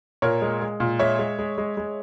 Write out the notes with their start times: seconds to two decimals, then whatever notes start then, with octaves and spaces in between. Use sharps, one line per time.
0.22 A#2 A#4 C#5
0.42 G#3
0.61 G#3
0.80 A#2
0.99 G#3 C#5 E5
1.19 G#3
1.39 G#3
1.58 G#3
1.77 G#3